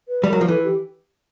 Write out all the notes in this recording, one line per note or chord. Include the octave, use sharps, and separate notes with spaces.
B4
G3
F#3 A#4
F3
E3 A4
G4